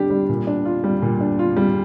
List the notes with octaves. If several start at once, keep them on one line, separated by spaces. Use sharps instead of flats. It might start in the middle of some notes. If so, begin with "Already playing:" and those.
Already playing: D3 G3 D4 G4
G3
A#2
D4
F4
G3
A#2
D4
F4
G3